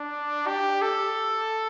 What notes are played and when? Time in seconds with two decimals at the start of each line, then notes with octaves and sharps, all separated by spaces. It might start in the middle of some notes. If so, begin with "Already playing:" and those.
Already playing: D4
0.47 G4
0.82 A4